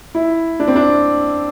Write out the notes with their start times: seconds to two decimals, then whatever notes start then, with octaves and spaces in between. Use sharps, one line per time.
0.15 E4
0.60 D4
0.68 C4
0.76 D4